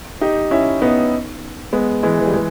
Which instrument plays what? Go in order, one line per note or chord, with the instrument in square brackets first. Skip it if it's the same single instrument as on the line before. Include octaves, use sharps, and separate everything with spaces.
[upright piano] D#4 G4
C#4 E4
B3 D#4
G#3 B3
E3 G#3
E3
G3
E3 G#3